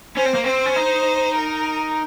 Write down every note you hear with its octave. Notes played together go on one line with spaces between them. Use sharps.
C#4 C5
C4
A#3
C4 C5
C#4
D#4
A#4